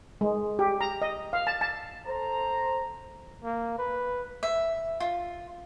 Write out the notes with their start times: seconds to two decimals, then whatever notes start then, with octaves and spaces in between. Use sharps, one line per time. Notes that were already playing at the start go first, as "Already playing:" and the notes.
0.21 G#3
0.59 G4
0.81 A#5
1.02 D#5
1.33 F5
1.47 A5
1.61 A5
2.06 A4 C5 A#5
3.44 A#3
3.78 B4
4.43 E5
5.00 F4